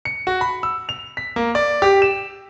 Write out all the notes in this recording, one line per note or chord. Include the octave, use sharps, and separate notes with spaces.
C#7
F#4
B5
E6
F7
B6
A#3
D5
G4
E7